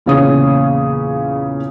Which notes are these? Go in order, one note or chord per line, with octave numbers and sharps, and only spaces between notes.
E2 A#2 C#3 C#4 C#5 D#6